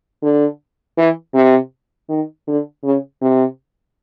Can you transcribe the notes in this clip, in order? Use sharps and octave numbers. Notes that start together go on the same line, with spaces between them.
D3
E3
C3
D#3
D3
C#3
C3